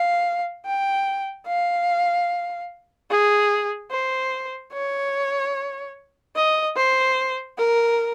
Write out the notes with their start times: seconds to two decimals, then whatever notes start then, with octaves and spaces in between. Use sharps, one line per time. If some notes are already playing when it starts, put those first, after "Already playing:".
Already playing: F5
0.66 G5
1.47 F5
3.10 G#4
3.91 C5
4.73 C#5
6.36 D#5
6.76 C5
7.58 A#4